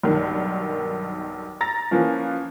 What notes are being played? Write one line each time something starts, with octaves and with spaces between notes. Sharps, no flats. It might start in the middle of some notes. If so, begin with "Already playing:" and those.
B1 G2 D#3
A#5 A6 A#6
E3 F3 A#3 C#4 F4